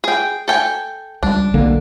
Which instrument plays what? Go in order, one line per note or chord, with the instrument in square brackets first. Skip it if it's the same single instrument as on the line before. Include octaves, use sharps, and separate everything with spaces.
[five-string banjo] G#4 G5
A4 G5 G#5
[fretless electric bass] C#2 G3 [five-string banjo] D4
[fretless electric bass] B1 D3 A#3